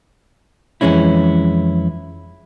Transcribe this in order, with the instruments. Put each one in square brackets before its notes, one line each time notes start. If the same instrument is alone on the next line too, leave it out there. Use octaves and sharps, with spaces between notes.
[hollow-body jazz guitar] F2 E3 G#3 C#4 E4